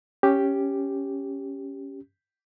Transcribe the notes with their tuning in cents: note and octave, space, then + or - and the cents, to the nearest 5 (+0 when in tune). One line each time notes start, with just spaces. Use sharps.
C#4 +0 G4 +0